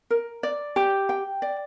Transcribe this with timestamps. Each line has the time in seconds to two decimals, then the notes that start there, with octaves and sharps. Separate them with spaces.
0.10 A#4
0.43 D5
0.76 G4
1.09 G5
1.42 D5